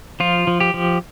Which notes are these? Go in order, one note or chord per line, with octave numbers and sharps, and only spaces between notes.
F3 F4
F3
G4
F3